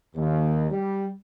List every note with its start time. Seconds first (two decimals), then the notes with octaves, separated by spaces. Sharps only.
0.16 D#2
0.70 G3